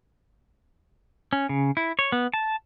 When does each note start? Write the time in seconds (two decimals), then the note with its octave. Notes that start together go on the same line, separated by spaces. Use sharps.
1.33 C#4
1.49 C#3
1.77 E4
1.99 C#5
2.12 B3
2.34 A5